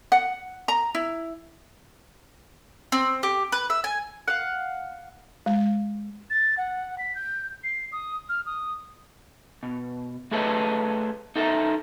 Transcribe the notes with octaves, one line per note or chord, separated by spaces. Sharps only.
F#5
A#5
E4
C4
G4
B4
E5
G#5
F5 F#5
G#3
A6
F#5
B6
G6
C7
D#6
F6
D#6
B2
A3 G#4 A4 B4 C#5 D#5
D#4 A4 A#4 E5